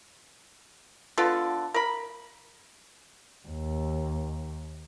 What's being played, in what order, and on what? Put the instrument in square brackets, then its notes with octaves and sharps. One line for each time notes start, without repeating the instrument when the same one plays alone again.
[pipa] D3 B3 F4 A4
A#4 B5
[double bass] D#2